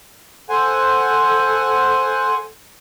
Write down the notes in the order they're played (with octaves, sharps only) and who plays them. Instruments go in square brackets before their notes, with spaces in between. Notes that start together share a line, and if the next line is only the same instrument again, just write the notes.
[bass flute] A4 [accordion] C5 F#5 G#5